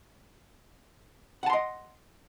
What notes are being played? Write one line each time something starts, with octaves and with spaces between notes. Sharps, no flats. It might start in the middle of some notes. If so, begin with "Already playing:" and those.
D#5 F#5 A5 C6